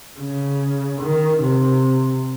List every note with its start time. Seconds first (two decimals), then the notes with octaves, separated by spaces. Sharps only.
0.20 C#3
1.02 D#3
1.43 C3